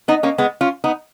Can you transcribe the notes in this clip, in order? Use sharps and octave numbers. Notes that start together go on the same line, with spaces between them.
B3 D#4
A#3 C#4
G#3 B3
C#4 F4
B3 D#4